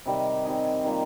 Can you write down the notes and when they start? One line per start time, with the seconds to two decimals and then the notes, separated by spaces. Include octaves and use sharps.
0.06 C3 D#3 G3 C4
0.45 G3 C4 D#4 G#4
0.84 D#3 G3 A#3 F4